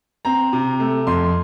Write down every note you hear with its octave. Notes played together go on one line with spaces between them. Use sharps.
C4 A#5
C3
A3
F2 C6